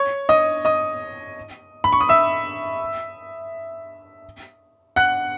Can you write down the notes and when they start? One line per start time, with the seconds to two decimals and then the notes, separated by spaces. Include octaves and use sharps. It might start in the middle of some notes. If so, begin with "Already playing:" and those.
Already playing: C#5 C#6
0.29 D#5 D#6
0.65 D#5 D#6
1.84 B5
1.93 C#6
2.01 D#6
2.09 E5 E6
4.96 F#5 F#6